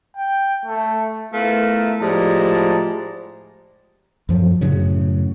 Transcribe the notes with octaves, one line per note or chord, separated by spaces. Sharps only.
G5
A3
A3 B3 E4 F4 A#4
A2 F3 G3 G#3 A5 A#5
F#2 F3 F#3
F#2 A2 C#3 F#3